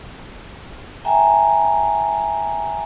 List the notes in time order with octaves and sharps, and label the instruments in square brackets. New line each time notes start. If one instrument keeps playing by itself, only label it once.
[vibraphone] E5 G5 G#5 A#5